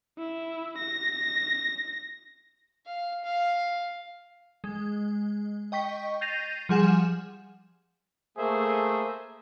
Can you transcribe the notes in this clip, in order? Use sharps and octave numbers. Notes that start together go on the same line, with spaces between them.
E4
A#6
F5
F5
G#3
D#5 G5 C#6 B6
G6 A6 A#6 C7 D#7 F7
F3 G3 G#4 F#5 G#5 E7
A3 A#3 G#4 C5 E5